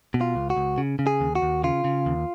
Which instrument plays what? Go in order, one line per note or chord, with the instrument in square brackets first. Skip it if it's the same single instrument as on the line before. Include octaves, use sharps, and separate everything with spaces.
[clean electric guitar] B2
F4
C#2
F#4
C#2
C#3
C#3
G#4
D#2
F#4
D#2
C#3 F4
C#3
D#2